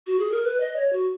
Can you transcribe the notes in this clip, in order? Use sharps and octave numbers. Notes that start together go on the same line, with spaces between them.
F#4
G#4
A#4
B4
D#5
C#5
F#4